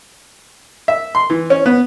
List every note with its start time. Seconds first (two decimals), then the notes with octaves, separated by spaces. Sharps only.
0.88 E5
1.15 C6
1.30 E3
1.50 C#4
1.66 B3